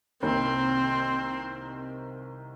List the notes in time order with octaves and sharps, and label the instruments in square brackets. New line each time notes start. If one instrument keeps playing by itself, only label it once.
[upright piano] C2 C3 D#3 A#3 [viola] C4